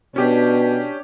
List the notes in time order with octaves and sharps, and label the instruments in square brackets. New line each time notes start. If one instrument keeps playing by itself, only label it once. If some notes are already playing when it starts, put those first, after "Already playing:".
[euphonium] B2 [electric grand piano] C#4 G4 [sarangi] D4